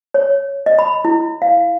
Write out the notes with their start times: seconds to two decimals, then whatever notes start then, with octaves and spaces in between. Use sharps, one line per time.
0.14 C#5
0.66 D#5
0.79 B5
1.05 E4
1.42 F5